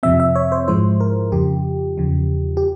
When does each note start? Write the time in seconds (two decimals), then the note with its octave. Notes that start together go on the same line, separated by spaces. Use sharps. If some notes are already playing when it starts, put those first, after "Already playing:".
0.03 F2 C3 F3 C4 E5
0.20 E5
0.35 C#5
0.52 C5
0.68 G#2 F3 G#3 E4 C5
1.00 A#4
1.32 F2 C#3 F3 G4
1.98 E2 C#3 F3
2.57 G4